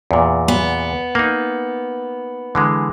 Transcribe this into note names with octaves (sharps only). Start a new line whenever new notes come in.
E2 A#2
B3
A#3 D#4
D3 E3 G#3